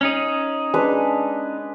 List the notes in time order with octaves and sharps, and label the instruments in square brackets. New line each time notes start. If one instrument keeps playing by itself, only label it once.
[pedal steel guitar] C#4 D#4 G#4
[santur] G#3 D4 B4